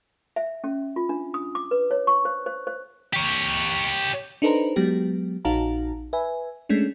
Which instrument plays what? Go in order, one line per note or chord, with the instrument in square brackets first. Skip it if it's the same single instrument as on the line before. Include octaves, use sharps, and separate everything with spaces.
[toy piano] E5
C#4
F4
D4
D#6
D6
B4
C#5
C#6
C5
C5
C5
[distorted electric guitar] G4 C#5
[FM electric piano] D4 D#4 A4 B4 C5 A#5
F#3 G#3 B3 G4
A#1 D#4 F#4 F5 A5 A#5
B4 E5 G#5
G#3 A3 C#4 D4